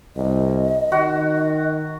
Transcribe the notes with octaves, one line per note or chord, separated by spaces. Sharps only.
C2 D#5
D#3 F#4